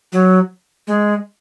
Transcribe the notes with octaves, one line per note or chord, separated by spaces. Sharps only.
F#3
G#3